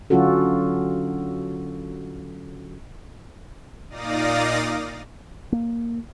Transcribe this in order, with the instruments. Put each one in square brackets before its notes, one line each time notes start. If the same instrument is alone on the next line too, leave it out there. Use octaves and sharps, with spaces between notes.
[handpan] D3 F#3 C#4 F4 F#4 A4
[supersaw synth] A#2 D#4 D5 F5 D#6 A#6
[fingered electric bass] A#3